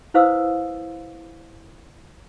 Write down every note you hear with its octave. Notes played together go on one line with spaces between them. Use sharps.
E4 B4 C5 F5 D#6 E6